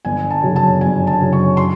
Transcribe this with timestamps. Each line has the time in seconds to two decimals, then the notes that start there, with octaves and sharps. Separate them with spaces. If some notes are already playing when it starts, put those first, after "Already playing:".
0.05 G1 G#5
0.31 A5
0.43 F#2 C#3 F#3
0.56 A5
0.81 G1 G#5
1.07 A5
1.19 F#2 C#3 F#3
1.33 C#6
1.57 C6